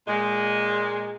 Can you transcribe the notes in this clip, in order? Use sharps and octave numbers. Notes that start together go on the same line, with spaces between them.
A#2 G#3